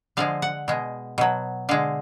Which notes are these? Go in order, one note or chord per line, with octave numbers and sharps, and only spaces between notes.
D3 F3 G#3 F5
F#5
B2 G#3
B2 F#3
D3 G#3 F5